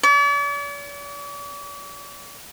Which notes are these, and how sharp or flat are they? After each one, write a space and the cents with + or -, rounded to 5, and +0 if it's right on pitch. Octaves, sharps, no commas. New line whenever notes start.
D5 -45